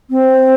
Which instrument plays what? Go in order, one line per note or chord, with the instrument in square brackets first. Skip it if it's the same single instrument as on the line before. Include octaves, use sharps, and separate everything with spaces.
[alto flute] C4